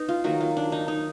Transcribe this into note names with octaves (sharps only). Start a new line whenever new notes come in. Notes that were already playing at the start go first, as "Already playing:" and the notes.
Already playing: B3 D#4
F4
D#3 F#3 A#3 F#4
F4
D4
D#4
D#4